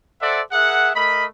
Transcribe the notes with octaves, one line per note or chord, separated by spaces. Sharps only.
A4 C5 D5 E5 F#5
G#4 A#4 E5 F#5
A3 A#4 D#5 B5